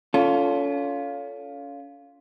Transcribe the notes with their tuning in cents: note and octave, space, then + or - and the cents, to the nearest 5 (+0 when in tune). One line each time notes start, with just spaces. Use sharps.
C#4 +35 F4 +0 A4 +0